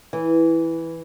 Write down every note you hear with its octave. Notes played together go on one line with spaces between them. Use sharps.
E3